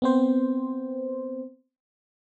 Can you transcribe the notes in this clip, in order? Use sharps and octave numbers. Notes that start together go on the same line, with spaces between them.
B3 C4 C5